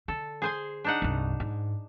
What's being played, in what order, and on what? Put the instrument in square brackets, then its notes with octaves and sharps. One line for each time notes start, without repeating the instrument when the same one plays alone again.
[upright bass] D3 [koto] A4
[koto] G#4 C5 G#5
D4 D#4 F#5
[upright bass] C2 G2
G#2